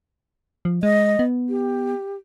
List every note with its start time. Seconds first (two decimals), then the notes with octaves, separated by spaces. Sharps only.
0.65 F3
0.83 G#3 D#5
1.19 B3
1.49 G4